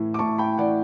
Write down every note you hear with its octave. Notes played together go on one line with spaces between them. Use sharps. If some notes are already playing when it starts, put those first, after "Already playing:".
Already playing: A2 E3
D6
A2 A5 C#6
G5 B5
E3 D5 F#5